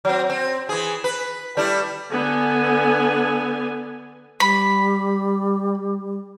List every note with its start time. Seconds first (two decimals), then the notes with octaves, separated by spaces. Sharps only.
0.05 F#3 C4
0.30 C4
0.69 E3 G#4
1.04 B4
1.57 G3 A3 E4
2.13 D3 B3 G#5
4.40 G3 B5